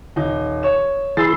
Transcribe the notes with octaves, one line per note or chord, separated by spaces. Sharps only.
D#1 D#4
C#5 E7
E3 G#4 B5 C6 E6 A6